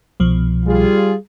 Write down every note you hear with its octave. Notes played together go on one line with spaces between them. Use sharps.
C2 B2 F3
G3 F4 G#4